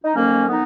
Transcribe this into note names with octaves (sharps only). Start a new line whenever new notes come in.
D#4
F2 D#3 F#3 A#3 C#4
B3 D#4